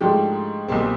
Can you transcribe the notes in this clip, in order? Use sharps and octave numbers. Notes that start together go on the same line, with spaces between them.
G#2 F3 A3 D4 G4
B1 A#2 G3 C4